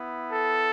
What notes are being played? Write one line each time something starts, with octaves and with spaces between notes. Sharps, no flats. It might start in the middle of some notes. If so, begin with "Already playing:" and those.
Already playing: B3 E4
A4